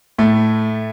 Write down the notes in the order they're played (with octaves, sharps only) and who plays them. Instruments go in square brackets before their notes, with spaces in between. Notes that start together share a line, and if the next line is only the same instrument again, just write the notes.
[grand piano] A2 [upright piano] A3